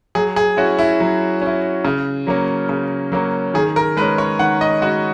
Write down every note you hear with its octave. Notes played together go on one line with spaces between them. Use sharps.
F#3 G#4
G#4
C#4 E4 F#4
E4
F#3
C#4 E4
C#3
F#3 A#3 C#4
C#3
F#3 A#3 C#4
D#3 G#4
A#4
G#3 C#4 B4
C#5
D#3 F#5
D#5
G#3 C#4 F#4